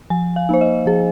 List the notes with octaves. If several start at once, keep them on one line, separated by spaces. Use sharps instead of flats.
F3 G#5
F5
A#3 D#4 C5
D#5
F3 G#4